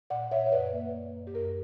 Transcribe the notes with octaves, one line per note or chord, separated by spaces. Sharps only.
A#2 D5 F#5
A#2 C#5 E5
C#5
F#2 B4 D5
A#3
F#2
F#2
G4
F#2 A#4